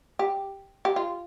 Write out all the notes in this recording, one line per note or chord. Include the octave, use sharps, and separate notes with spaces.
G4
G4
F4